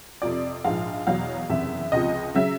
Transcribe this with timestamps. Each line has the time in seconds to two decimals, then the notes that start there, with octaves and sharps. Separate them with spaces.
0.22 F2 C3 F3 D5
0.64 A#1 G#2 F3 F5
1.07 E2 B2 F#3 F5
1.49 F#1 E2 C3 E5
1.92 C#2 C3 F3 D#5
2.34 C#3 F#3 E5